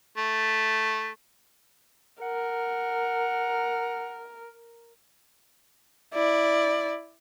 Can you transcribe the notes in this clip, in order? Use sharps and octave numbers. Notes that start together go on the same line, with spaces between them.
A3
A#4 F#5
E4 D5